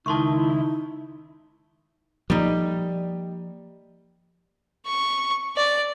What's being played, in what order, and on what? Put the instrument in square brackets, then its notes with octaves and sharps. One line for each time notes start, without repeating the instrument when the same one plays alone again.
[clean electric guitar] C#2 D#3 [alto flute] D#4 [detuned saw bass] E4 [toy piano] A5 C6 C#6
[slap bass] F3 A#3 [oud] G3 D#4
[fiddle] C#6
D5